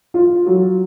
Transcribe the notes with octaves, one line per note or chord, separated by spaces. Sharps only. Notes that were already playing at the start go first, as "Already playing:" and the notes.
F4
F#3